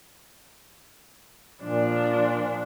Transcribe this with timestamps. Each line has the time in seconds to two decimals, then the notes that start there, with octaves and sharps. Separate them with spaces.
1.64 A#2 F3 D4